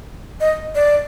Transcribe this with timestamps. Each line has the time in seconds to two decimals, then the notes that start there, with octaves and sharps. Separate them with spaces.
0.41 D#5
0.75 D5